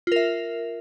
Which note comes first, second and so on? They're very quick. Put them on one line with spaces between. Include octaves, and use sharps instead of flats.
F4 A#4 E5